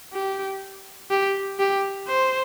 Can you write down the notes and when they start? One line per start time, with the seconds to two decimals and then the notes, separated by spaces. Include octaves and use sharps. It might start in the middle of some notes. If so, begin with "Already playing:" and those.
0.13 G4
1.11 G4
1.59 G4
2.08 C5